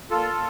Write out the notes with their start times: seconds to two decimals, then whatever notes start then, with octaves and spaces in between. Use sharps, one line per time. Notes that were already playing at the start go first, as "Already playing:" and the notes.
0.10 A#2 F4 A4
0.35 A#2